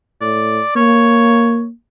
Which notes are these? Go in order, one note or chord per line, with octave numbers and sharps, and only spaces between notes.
A2 D5
A#3 C#5